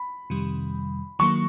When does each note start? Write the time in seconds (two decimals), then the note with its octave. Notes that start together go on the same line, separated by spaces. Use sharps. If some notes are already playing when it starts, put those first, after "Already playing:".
Already playing: B5
0.30 F2 C3 D#3 G3
1.19 D#3 F#3 A#3 C#6